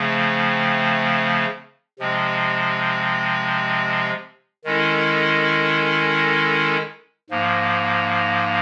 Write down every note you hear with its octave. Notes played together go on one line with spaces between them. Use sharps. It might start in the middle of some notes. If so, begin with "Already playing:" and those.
Already playing: C#3 F3 A3 C4
C3 F3 G#3 C4
D#3 G#3 C#4 E4 A4
G#2 F3 A#3